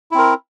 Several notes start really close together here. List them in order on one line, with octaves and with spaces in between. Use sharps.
E4 C4 A#4